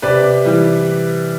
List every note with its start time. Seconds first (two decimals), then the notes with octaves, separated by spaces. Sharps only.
0.02 C3 B4 D5
0.45 E3 G3